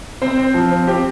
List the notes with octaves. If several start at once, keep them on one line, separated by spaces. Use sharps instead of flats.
C4 C5
C4
F3
C4
C4 G4